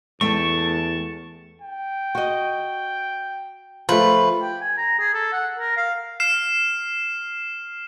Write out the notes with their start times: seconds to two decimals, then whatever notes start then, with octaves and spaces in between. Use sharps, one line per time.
0.21 E2 A3 G5 A5 C#6
1.62 G5
2.15 F#4 D#5
3.89 F3 A3 B4
4.42 G5
4.61 G#5
4.77 A#5
4.99 G#4
5.14 A4
5.33 F#5
5.58 A#4
5.77 F5
6.20 F6 C7 E7